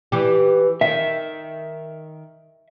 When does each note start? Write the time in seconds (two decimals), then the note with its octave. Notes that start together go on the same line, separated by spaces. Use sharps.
0.12 E3 G4
0.81 D#3 E5